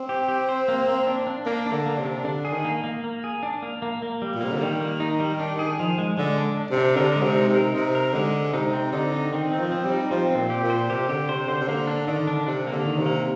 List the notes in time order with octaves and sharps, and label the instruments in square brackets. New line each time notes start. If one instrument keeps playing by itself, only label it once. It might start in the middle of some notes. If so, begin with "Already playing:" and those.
Already playing: [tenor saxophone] C4
[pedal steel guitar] G4
G4
C5
A#3
A#3
D4
D4
[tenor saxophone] A#3 [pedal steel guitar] D4
[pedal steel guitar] D4
[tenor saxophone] D3
[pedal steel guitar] A#3
[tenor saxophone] C3
[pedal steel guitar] D4
[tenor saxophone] D3 [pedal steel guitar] D4
[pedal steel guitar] G#4
[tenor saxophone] D#3
[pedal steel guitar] A#3
A#3
A#3
G#4
D4
A#3
A#3
A#3
G3
[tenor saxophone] A#2
[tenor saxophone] C3 [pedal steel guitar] A#3
[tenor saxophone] D3
[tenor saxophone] D#3 [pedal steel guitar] G3
[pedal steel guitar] A#3
D#4
G3
D4
G#4
F3
G#3
[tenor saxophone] D3 [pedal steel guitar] G#3
[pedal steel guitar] D4
D4
[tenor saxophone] C3
[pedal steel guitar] D4
[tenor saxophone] D3 [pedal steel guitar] A#4
[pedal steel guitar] G#3
[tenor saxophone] C3
[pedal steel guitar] D#4
[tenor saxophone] C3
[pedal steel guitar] A#4
[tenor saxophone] C3 [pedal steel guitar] D#4
[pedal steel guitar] A#4
[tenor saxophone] D3 [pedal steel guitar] G#3
[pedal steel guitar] G#3
[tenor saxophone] C3 [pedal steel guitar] D#4
[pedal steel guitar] C4
[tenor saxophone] D3 [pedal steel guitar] D#4
[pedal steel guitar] D#4
[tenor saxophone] D#3 [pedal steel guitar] C4
[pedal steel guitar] C4
[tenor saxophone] F3
[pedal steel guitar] C4
[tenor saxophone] G3
[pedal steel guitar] D#4
[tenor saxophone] F3 [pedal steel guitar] C4
[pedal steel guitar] C4
[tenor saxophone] A#2
[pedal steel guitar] G4
[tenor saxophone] A#2
[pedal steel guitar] C5
[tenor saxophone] C3 [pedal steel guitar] G4
[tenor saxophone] D3 [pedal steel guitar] G4
[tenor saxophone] C3 [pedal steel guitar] C5
[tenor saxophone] D3 [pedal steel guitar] C5
[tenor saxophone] C3
[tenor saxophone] D3 [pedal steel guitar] A#3
[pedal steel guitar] D4
[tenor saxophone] D3 [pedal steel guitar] D#3
[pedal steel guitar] D4
[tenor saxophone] C3 [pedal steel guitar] D4
[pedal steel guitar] A#3
[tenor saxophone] D3
[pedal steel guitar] D#3
[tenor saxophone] C3
[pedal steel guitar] A#3